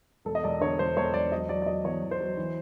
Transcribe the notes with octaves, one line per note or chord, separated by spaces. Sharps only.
E1 A4
D#5
E1 D5
D3 C#5
E1 C5
E1 C#5
E1 D5
F#3 D#5
F#3 D5
D5
F#3 D#5
E2 C#5
E2
C5
F#3
E3